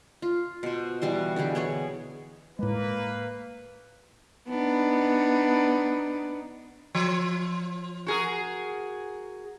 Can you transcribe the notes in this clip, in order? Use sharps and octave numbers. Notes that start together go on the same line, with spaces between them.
F4
B2 C5
B2 E3 G3 C6
D3 E3 G4 G#4
B3 G#4 C#5
A2 G#3 A#3 B4
B3 D4 D#4
F3
F#4 G#4 A#4